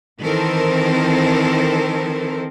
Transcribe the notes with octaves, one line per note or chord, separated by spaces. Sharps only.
D#3 E3 C4 A4 A#4 C5